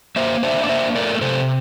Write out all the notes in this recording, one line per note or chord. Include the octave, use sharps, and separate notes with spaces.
A#3 C5 E5
D4 C5 E5
D5
A#3 C5 E5
A3 A#4 D5
C3 A4 C5